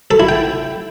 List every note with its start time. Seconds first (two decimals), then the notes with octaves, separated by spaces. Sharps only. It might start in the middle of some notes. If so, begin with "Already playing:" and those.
0.11 A4
0.20 E4
0.29 G5